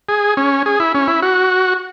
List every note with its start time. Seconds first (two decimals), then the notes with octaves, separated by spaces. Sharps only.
0.09 G#4
0.37 C#4
0.66 G#4
0.80 E4
0.95 C#4
1.08 E4
1.22 F#4